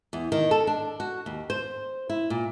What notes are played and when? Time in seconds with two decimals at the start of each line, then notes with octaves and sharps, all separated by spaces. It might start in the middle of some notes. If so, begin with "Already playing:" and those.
0.13 E2
0.32 D#3
0.51 A4
0.67 D4
1.00 F#4
1.26 D#2
1.50 C5
2.09 E4
2.30 A#2